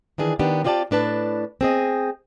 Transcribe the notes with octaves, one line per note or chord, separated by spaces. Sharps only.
D#3 E3 D4 G#4
D#3 B3 D4 G4
C4 F4 G4 D5 G5 A5
A2 D4 B4 A5
C4 G#4 D#5